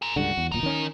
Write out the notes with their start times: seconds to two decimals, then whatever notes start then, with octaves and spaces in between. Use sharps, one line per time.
0.02 G#4 A#4
0.16 C#2 G2 D3 F#4
0.37 E2
0.52 D1 A#2 D#4 A#4
0.63 D#3 C#4